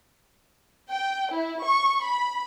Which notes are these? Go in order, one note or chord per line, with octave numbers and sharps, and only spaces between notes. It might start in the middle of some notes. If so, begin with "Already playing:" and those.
G5
E4
C#6
B5